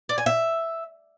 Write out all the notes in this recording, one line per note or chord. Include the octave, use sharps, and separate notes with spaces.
D5
G#5
E5